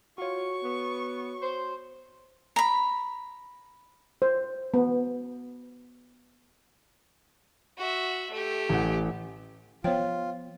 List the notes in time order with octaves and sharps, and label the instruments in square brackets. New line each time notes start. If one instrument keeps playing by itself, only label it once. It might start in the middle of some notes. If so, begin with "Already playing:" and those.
[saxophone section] F4 [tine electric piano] F#4 C#5 [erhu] C#6
[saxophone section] B3
C5
[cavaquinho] A#5 B5
[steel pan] C5
B3
[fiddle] F#4 E5
A3 G4
[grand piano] A1 F#5
[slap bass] F3 B3 [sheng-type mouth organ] F4 [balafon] C5 C#5 G5